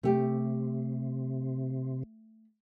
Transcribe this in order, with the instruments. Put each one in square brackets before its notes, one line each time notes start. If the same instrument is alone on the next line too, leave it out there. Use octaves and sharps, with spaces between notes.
[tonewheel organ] C3 [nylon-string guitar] A3 G4